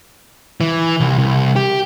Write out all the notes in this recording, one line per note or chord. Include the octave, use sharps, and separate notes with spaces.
E3
C2
C2
G4